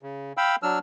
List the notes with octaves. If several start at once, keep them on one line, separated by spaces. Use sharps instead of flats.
C#3
F5 G5 B5 E6
F#3 D4 E6 F6